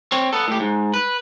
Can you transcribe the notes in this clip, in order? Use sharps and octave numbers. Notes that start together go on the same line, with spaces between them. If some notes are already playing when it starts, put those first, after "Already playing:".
C4 C#5
B3 A4
A2 G4
G#2
B4